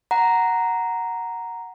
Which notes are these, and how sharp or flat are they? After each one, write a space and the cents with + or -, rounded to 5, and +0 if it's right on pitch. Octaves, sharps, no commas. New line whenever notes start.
F#5 +0 A#5 +0